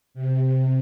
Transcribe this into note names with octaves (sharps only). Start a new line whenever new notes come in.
C3